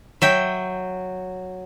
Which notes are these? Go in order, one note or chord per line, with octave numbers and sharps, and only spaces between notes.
F#3 E5 G5